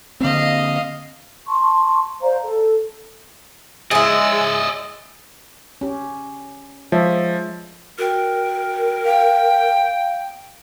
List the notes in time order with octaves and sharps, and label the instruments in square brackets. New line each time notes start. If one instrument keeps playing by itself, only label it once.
[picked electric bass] D3 A#3 C4 [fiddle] D#5 F5
[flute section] A5 C6 C#6
C5 D5 F5 A#5
A4
[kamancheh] G#3 E6 [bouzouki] E4 G#4 [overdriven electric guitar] D5 D#5
[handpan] C#4 G4
[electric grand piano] F3 [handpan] G#3 C#5 E5
[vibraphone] F#4 G5 [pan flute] A#4
[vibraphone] F5 [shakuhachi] G5